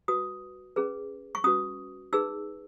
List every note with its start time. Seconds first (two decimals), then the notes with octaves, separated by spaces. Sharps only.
0.08 F#4 B4 D#6
0.76 C#4 G#4 B4
1.35 C#6
1.44 C#4 F#4 B4 D#6
2.13 D#4 G#4 B4 E6